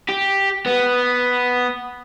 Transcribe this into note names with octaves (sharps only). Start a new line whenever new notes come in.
G4
B3